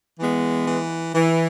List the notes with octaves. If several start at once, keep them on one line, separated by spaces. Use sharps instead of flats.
E3 G#3 B3
E3
E3